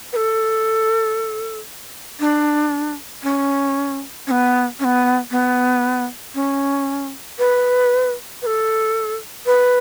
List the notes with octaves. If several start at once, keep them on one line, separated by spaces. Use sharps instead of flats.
B4
A4
D4
C#4
C#4
B3
C#4
B3
B3
C#4
B4
B4
A4
B4